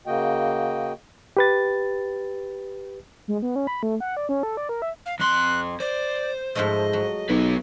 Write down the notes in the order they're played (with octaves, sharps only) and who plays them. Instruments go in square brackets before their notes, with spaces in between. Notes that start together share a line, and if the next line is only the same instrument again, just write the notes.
[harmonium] C#3 A#3 F#4 D#5 G5
[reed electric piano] G4 B4 A6
[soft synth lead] G#3
B3
C#4
B5
A3
F#5
D5
C#4
A4
D5
A#4
E5
[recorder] F5
[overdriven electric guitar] F2 C6 [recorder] F#6
[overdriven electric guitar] C5 [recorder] D5
[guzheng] G#2 F3 A3 [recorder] D#5
[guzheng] F#3
[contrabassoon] B1 [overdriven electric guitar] D#4 B4